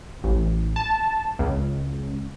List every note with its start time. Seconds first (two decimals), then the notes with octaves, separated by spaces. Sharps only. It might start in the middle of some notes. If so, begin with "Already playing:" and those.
0.24 A1
0.76 A5
1.39 C#2